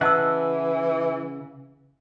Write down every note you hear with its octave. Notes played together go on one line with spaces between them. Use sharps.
C#3 E3 D#5 F#5 A5 E6